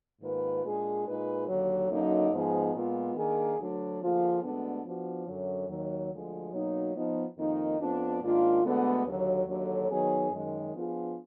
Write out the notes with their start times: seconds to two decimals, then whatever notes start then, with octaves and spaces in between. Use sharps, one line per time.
0.22 G#2 D#3 A#3 F4 B4
0.64 A#2 G#3 D4 G#4
1.06 A#2 G#3 D#4 G#4 B4
1.47 D#2 D3 F#3
1.90 F#2 D3 F#3 A#3 D#4
2.31 G#2 F3 B3 D#4 G#4
2.74 A#2 G#3 B3 F4
3.16 D#3 A#3 D4 G#4
3.58 D2 D3 F#3 D4
4.01 D3 F3 A#3 F4 G#4
4.43 D2 D3 G#3 B3 D4
4.84 F3 B3 D4 F#4
5.26 F#2 D3 F#3
5.68 D#2 D#3 F#3
6.11 D2 D3 F3 G#3
6.52 B2 F#3 A#3 D#4
6.95 F3 B3 D#4
7.37 F2 D#3 A#3 D#4
7.79 F2 F3 B3 D4
8.22 G#2 D#3 A#3 D4 F4
8.63 D2 D3 G#3 B3
9.05 D#2 D3 F#3
9.47 D#2 D3 F#3
9.90 D#3 F#3 B3 D#4 G#4
10.31 F#2 D#3 G#3
10.73 F3 B3 D4 F4 G#4